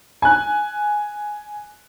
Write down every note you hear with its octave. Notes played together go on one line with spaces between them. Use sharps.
G#5 F#6